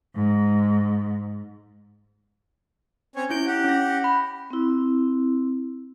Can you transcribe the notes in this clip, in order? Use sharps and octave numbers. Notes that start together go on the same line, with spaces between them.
G#2
C4 C#4 C#5
C#4 E4 G6 D7
G4 F#5
C#4 A#6
B5
C4 E4